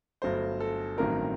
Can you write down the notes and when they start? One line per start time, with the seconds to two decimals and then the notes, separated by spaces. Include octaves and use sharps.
0.22 G1 G2 F#3 A3 C5
0.60 A4
0.97 A1 G2 D#3 F#3 C4 A#4